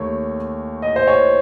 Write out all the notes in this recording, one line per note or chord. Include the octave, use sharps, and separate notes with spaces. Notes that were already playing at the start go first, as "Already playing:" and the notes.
Already playing: D#2 D#3 A3 C#5
D#5
C5
C#5